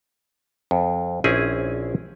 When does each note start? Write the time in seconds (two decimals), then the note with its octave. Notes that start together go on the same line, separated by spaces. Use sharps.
0.71 F2
1.24 A#1 C4 C#4 E4 G#4 G#5